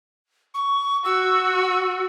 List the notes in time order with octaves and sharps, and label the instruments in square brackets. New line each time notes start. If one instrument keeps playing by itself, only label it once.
[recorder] C#6
[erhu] F#4 [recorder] E6